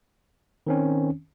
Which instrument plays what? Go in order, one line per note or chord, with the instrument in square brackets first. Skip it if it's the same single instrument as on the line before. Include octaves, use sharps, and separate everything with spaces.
[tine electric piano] D#3 C4 C#4